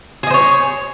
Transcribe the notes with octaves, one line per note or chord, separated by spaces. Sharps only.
G#4 C5 C#5 D#5